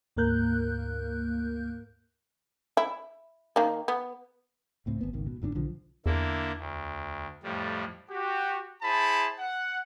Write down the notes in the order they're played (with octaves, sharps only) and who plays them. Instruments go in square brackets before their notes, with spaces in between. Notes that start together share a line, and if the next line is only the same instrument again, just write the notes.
[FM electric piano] D2 G#2 A#3 A#4 F#6 G6
[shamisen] E4
D#3 A#3
B3
[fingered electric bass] C#2 A2 C4
G#1 B3
G#1 C#2 D#3
B2
G1 G#2 C4 D4
B1 D3 F3
[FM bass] E2 [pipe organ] D3 A#3 E4
[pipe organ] D2
F2 A2 G3
[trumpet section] F#4 G4
E4 G#4 C5 A5 B5
F#5